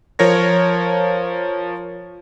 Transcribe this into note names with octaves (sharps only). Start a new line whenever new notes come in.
F3 A#4 C#5 A#6